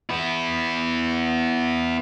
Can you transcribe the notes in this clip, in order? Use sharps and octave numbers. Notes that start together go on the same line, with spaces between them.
B3 E4